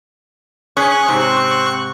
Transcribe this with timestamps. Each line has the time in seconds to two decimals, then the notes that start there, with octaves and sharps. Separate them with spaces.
0.77 C#4 G#4 C#6 F#6
1.08 G#2 C3 C4